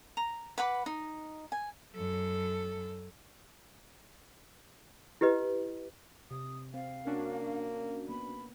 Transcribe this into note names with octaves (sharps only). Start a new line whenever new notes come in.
A#5
B4 F#5 B5 D6
D#4
G#5
F#2 A4
E4 G4 B4 D#5
C3 D#6
C4 F5
A#3 C#4 D4 F#4
A#3 B3 B5